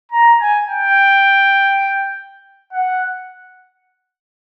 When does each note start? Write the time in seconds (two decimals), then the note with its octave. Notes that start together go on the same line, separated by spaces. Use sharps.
0.11 A#5
0.40 G#5
0.69 G5
2.73 F#5